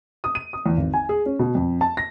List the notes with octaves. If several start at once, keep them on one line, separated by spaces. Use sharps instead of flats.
D#6
D#7
D#6
E2
G#1
G#5
G#4
C#4
B2
F2
A5
A#6